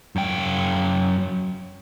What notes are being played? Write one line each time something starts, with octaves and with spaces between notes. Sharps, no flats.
F#2 G5